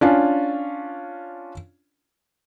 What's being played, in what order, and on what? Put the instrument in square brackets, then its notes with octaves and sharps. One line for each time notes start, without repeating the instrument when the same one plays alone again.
[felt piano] C#4 D4 F4